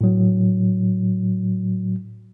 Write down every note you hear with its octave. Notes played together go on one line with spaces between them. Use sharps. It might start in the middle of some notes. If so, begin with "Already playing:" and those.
A2 F#3